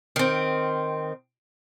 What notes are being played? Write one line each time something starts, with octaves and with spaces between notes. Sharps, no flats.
D#3 C4